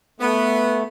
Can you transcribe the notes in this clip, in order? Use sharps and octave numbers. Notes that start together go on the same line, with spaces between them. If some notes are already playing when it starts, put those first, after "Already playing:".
A3 B3